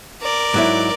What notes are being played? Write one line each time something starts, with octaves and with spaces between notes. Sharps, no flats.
A#4 D5
G#2 F#3 E4